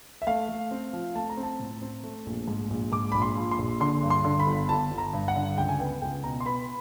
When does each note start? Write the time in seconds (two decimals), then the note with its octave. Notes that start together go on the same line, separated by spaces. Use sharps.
0.22 E5
0.27 A3 F5
0.49 A3
0.71 C4
0.93 F3
1.15 A3 A5
1.29 A#5
1.37 C4
1.43 A5
1.59 A2
1.82 C4
2.03 A3
2.26 A#1
2.48 G#2
2.70 A#1
2.92 G#2 D6
3.12 A#1 B5
3.22 C6
3.36 F3
3.51 C6
3.59 A#1
3.80 D3 C6
4.03 G2
4.10 C6
4.25 D3
4.40 B5
4.47 G1
4.69 G1 A5
4.91 G1
4.98 A#5
5.13 G2
5.28 F#5
5.36 D3
5.58 C#2 G5
5.69 G#5
5.80 B3 G5
6.02 C#2 G5
6.23 B2 A#5
6.41 C6
6.46 B3 B5